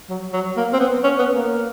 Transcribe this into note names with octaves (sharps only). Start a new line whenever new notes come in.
F#3
F#3
A#3
C4
B3
C#4
B3
A#3